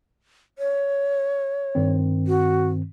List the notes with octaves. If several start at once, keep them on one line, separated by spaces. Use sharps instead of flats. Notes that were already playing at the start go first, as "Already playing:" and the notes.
C#5
G2 D#3 C4
F#4